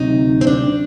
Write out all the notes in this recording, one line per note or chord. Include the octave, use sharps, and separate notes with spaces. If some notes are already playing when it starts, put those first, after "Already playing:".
Already playing: D2 C3 F#3 D#4
C4
D4